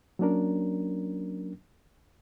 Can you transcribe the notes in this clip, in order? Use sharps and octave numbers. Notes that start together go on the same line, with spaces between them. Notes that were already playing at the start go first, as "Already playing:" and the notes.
F#3 A#3 C#4 D4 A#4